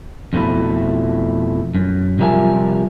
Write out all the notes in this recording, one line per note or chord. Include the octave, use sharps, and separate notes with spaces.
F2 B2 A3 E4
F#2
C3 F3 G3 A#4 E5 G#5